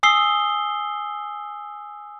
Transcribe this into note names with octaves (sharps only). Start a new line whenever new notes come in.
G#5 D#6 E6 C7 G7